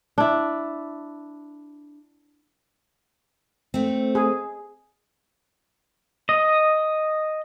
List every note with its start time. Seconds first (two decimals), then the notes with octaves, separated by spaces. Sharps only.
0.18 D4 E4
3.74 A3 C4
4.15 G#4
6.29 D#5